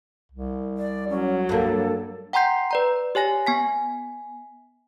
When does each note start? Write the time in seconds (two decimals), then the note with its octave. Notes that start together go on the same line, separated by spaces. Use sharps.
0.31 C2
0.78 D5
1.10 F#3 C#4
1.49 G2 A#3 A4
2.33 F#5 G5 A#5 C6 G6 C7
2.71 B4 D5 A#5
3.15 G4 C#5 G#5 A#6
3.46 B3 G#5 B6